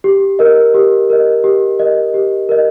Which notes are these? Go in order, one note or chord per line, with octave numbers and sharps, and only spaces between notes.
G4
A#4 D#5
G4
A#4 D#5
G4
A#4 D#5
G4
A#4 D#5